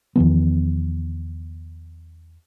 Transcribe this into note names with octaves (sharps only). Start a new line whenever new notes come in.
E2 D#3 F3 B3